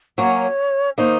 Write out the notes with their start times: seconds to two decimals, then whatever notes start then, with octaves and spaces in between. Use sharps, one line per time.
0.18 F#3 A#3 C#4 C#5
0.98 D#3 A#3 D#4 C5